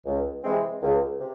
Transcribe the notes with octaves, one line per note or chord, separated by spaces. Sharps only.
C#2
C3 E3 G#3 C4
C#2
C3